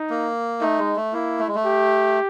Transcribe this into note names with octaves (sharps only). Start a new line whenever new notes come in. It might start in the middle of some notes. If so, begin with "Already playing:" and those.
Already playing: D#4
A#3
A3 D#4
G#3
A3
A#3 E4
A3
G#3
A3
G4